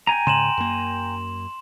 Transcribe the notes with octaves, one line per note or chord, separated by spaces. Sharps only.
G5 G#5 A#5
G#2 C#3 C6 E7 F#7
F#2 A#3